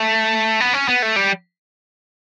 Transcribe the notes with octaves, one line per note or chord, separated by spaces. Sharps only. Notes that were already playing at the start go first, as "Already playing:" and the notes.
Already playing: A3
B3
C#4
B3
A3
G3